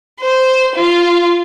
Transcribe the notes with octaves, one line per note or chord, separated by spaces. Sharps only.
C5
F4